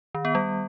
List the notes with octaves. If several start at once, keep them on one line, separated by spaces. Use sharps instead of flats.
D#3
B3
G3